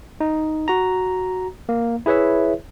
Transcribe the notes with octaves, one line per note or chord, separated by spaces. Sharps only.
D#4
F#4 A#5
A#3
E4 G#4 B4 C#5 E5